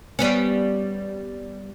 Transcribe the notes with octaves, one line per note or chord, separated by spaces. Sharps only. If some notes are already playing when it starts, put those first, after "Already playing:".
G3 B3 C#4